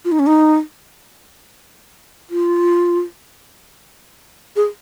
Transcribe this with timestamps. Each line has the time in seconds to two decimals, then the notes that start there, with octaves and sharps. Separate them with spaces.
0.05 F4
0.12 D#4
0.19 C#4
0.27 D#4
2.30 F4
4.56 G#4